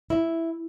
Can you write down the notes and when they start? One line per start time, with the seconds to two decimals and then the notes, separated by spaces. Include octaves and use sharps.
0.10 E4